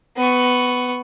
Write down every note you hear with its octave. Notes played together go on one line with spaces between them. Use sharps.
B3 C#6